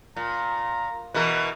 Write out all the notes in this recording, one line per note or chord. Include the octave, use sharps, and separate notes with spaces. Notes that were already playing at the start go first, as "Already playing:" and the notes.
A#2 A#5
B2 E3 A#4 B4